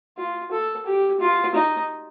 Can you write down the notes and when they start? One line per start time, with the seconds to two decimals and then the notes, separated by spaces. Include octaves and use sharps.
0.18 F4
0.51 A4
0.86 G4
1.20 F4
1.55 D#4